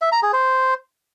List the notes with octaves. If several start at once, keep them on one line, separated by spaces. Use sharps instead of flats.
E5
A#5
G#4
C5